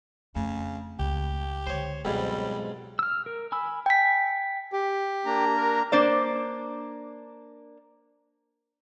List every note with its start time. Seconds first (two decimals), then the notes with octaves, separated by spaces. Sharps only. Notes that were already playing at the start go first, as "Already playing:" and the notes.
0.35 F2 C#3 A3
0.99 C#2 G4
1.67 D3 G#3 C5 C#5
2.05 B1 F2 G#2 G3 B3
2.99 E6 F6
3.26 A#4
3.52 G#5 B5 E6
3.86 G5 G#5 B6
4.72 G4
5.26 A#3 D4 A#5
5.57 A#4
5.92 A#3 D4 C5 D5